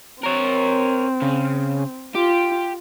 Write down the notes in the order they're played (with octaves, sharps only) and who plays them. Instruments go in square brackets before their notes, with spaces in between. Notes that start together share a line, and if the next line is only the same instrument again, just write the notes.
[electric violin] C4 [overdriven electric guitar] A#4 C#5
[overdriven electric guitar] C#3
[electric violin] F4 [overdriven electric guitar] G4